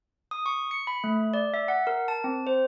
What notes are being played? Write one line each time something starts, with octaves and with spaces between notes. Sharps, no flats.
D#6
C#6
C#7
B5
A3
D5
E5
F#5
A#4
A5
C4
C5